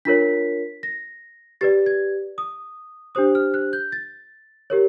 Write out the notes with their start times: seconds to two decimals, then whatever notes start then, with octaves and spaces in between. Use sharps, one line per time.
0.05 D4 F4 A#4 C#5 B6
0.83 A#6
1.61 G4 B4 D5 A6
1.86 G#6
2.38 D#6
3.15 D4 G4 C5 D#6
3.35 F6
3.54 F#6
3.73 G6
3.92 A6
4.70 G4 A#4 C#5